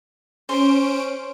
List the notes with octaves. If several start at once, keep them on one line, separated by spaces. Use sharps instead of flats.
C#4 C5 D7